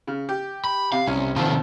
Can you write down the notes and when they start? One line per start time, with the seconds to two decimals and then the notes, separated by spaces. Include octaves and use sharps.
0.07 C#3
0.29 G4
0.65 B5
0.92 C3 F5
1.07 C2 C#4
1.36 B1 C3 D#3 F3